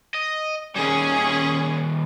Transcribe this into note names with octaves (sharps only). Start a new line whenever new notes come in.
D#5
D#3 G3 C#4 G#4